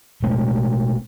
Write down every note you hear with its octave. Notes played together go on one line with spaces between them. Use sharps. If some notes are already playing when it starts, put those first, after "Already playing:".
B2 G#3 A3 C4